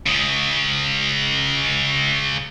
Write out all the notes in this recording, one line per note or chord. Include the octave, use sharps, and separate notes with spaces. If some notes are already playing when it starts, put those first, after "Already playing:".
C#3 G#3